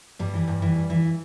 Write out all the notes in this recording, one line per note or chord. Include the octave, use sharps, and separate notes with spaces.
G2 G3
E3
G2
E3
G2
E3